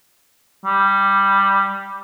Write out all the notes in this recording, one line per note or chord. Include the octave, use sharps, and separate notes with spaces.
G3